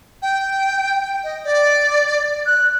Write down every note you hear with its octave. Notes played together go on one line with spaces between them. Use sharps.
G5
D#5
D5
F#6